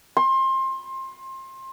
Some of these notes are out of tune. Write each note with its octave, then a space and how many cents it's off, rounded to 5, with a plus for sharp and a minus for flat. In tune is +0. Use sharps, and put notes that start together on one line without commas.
C6 +25